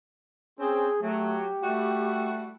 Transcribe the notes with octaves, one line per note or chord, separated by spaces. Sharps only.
C4 C#4 G#4
F#3 A3 G4
G3 A3 E4 F#4